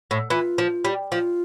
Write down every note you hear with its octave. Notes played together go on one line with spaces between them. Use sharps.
A2
E3 F4
F3
G3
F3 F4